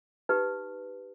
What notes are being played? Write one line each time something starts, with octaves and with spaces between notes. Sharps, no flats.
D#4 G4 B4